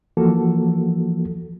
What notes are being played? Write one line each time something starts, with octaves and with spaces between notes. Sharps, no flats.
E3 F3 A#3 F#4 A4